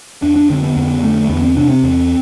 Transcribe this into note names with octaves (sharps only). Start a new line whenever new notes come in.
F2 D4
D4
D3 C4
B3
F2 B3
D3 A3
E2 B3
C4
C3 D4
C4
E2